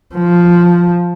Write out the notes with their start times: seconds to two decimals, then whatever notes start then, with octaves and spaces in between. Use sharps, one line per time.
0.15 F3